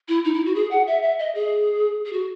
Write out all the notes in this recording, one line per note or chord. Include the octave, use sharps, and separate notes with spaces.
E4
D#4
E4
F#4
G#4
F#5
E5
E5
D#5
G#4
G#4
F#4